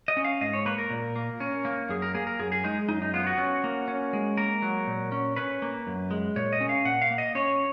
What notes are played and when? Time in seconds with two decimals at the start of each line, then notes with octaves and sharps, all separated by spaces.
0.08 D#5
0.17 C#4
0.25 F5
0.41 G#2 D#5
0.53 C#5
0.66 A#3 B4
0.78 A#4
0.90 A#2
1.16 A#3
1.40 C#4
1.65 A#3
1.89 F#2 G#4
2.02 A#4
2.14 A#3 G#4
2.27 A#4
2.39 F#2 G#4
2.52 G#4
2.64 G#3 D#4
2.89 F#2 D#4
3.02 D#4
3.14 B3 F4
3.27 F#4
3.38 C#4
3.64 A#3
3.88 C#4
4.13 G#3
4.37 A#3 A#4
4.62 F#3
4.87 A#2
5.12 C#4
5.36 C#4 B4
5.62 A#3
5.87 F#2
6.11 G#3
6.36 A#2 C#5
6.53 D#5
6.61 C#4
6.69 F5
6.85 A#2 F#5
7.02 F5
7.10 A#3
7.18 D#5
7.35 C#4 C#5